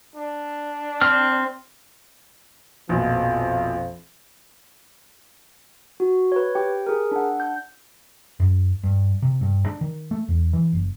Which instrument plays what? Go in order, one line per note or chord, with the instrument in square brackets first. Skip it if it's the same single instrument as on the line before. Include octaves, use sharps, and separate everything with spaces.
[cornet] D4
[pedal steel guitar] C4 F6
[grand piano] A#1 B2 [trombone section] F2 F3
[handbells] F#4
B4 C#5
G4 G5
G#4 A#4
D4 F#5
G6
[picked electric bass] F#2
G2
C3
G2
D4
D#3
A3
E2
E3
F#1